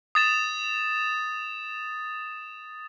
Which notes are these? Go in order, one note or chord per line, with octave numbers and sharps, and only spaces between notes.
D#6 A6 E7